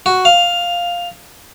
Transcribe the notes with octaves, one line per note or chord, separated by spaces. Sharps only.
F#4
F5